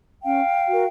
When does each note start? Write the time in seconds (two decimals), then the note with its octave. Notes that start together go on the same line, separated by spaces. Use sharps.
0.24 C#4 F5 G5
0.69 F#4 A#4